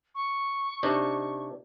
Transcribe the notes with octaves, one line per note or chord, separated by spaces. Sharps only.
C#6
C3 D4 D#4